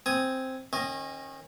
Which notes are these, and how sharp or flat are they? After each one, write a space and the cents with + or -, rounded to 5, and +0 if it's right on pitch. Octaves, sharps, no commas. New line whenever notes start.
C4 +0 G#5 +0 D#6 +0
D#3 +0 C#4 -35 D#5 +0